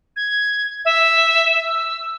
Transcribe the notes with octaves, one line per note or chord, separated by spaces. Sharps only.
G#6
E5
E6